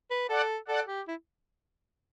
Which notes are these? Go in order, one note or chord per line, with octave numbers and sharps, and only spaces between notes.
B4
A4 D5 F#5
A4 D5 F#5
G4
E4